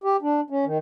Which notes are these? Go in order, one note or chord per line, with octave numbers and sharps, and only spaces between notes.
G4
D4
C#4
D#3